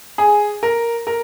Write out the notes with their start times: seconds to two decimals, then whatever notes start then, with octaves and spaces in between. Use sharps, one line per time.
0.18 G#4
0.63 A#4
1.07 A#4